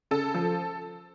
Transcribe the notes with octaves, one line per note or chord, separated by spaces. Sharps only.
C#3 A4
F3